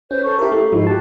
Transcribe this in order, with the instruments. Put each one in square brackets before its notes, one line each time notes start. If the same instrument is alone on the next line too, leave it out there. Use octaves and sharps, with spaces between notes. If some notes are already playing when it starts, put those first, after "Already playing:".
[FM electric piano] C#4 [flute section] B4 C5 G6
[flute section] A4 C#6
[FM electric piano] E4 A#4 [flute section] G4 F5
[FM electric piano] A3
[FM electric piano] G#2 F3 G#3 [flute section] D#4 E4 F5
[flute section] F#4 G4 [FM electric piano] A5